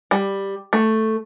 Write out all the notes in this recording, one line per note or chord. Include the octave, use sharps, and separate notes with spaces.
G3
A3